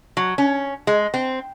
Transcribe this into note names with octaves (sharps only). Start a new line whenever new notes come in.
F#3
C#4
G#3
C4